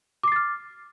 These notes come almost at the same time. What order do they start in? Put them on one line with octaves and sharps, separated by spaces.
D6 C7 A6 F6